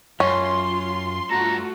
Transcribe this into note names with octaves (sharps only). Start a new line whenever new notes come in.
F#2 C#4 F4 C6
G2 A3 F4 F#4 A4 A#5